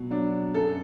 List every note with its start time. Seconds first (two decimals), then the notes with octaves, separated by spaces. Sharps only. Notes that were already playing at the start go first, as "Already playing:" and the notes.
Already playing: B2 F#3
0.10 F#3 D4
0.54 F#2 A4